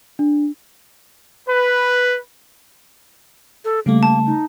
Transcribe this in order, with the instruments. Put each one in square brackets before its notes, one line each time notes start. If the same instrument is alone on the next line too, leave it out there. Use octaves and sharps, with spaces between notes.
[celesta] D4
[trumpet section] B4
[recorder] A4
[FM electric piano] C#3 G3 A3 [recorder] A#3
[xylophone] A5
[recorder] D#4